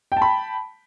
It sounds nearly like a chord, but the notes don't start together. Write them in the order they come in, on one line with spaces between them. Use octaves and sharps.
G5 A5 B5